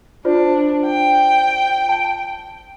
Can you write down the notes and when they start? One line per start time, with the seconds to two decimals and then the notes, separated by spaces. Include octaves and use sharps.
0.25 D4 F4 C5 D5
0.86 G5
1.89 A5 D7